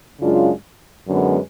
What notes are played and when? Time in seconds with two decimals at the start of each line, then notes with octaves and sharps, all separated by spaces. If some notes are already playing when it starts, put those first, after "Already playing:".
0.20 F#2 C#3 G#3 D4 F4
1.07 F#2 D3 G#3 B3